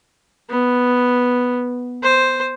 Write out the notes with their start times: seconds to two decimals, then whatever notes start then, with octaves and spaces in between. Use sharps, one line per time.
0.50 B3
2.03 C5